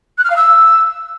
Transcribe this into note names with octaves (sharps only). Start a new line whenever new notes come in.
F#6
F6
F5
E6